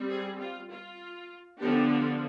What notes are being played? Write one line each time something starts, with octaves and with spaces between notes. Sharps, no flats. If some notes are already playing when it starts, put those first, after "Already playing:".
Already playing: G3 C4
G#4
F4
F4
D3 F3 B3 D4 G4